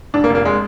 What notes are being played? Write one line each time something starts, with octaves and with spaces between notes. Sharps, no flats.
F1 D4
A#3
F1
A#3
G#3